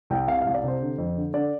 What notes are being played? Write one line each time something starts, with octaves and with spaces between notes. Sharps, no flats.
C2 G5
C3 F5
C2 F5
D5
C3 C5
D3
F2
D3
D3 D5